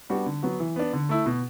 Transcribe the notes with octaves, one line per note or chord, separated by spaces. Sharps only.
G3 B3 D4 F#4
D3
F#3 B3 F#4
E3
B3 D4
D3
A3 E4
B2